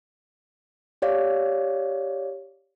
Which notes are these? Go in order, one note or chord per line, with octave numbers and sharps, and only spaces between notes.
G4 C#5 D5 F5